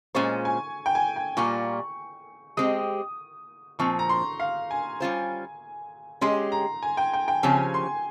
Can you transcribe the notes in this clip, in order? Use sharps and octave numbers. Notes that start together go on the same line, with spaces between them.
A#2 G#3 C#4 F4 C5 C#6
G#5
G5
G#5
G5
A#2 G3 A#3 F4 C#6
G#3 C4 G4 D#6
A#2 F3 C4 C#6
A#5
C6
F5
G#5
G3 C#4 F4 C5
G#3 C#4 G4 C6
A#5
G#5
G5
G5
G5
C#3 F3 C4 G4 C#5 G#5
C6